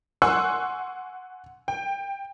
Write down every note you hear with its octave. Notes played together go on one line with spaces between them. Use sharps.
F#5 G#5 C6 C#6 E6 F#6
G5